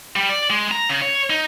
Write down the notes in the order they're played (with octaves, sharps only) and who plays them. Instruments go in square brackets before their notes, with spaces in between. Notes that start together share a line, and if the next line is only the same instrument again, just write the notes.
[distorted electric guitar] G3
D5
G#3
A#5
C#3
C#5
D#4